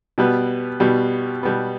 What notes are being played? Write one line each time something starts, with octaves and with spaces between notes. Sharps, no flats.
B2 G3 B3
B2 G3 B3
B2 G3 B3